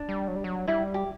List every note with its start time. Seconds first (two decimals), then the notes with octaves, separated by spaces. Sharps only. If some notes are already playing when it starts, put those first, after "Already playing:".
Already playing: D4
0.09 G3
0.28 F#3
0.36 G3
0.44 F#3
0.67 G3 E4
0.94 G4